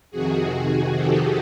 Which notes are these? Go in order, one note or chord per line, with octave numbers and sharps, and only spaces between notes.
F2 C3 D#3 F#4 G#4
G4 A4